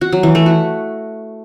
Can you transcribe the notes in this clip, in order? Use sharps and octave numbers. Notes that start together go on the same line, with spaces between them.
F#4
F#3
E3
A3
F#4